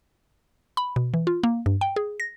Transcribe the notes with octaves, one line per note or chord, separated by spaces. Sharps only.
B5
B2
E3
F4
A#3
G2
G5
G#4
A#6